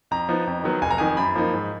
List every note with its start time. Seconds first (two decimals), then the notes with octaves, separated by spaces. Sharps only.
0.11 F2 A#5
0.29 F3 B3 D#4
0.47 F2
0.64 D#3 F#3 B3
0.82 F1 G#5
0.91 A#5
0.98 F2 D#3 G#5
1.17 F#2 B5
1.35 F3 A#3 D#4
1.54 G#2